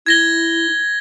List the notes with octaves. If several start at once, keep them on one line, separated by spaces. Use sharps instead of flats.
E4 G#6 A#6 G7